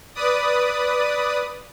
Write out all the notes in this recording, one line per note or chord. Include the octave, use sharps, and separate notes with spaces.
B4 D5 D#6